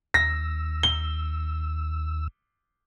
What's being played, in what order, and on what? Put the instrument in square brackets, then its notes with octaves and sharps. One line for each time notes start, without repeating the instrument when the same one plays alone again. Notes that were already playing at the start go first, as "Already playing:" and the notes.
[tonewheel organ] D#2 E6 [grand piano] A#6
[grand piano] G7